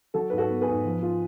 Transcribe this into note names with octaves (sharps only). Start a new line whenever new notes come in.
F#3 F#4 A4
G#2 B4
F#4 A4
B3
G#4 B4
G#2
F3
F4